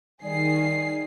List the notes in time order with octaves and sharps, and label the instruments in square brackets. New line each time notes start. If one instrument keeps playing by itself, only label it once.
[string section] D#3 G#4 C7 [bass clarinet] G3